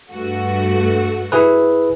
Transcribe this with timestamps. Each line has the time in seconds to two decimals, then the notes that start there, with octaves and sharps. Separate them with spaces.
0.11 G2 A3 F#4
1.32 E4 G#4 B4